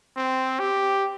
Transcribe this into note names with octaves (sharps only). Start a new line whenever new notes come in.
C4
G4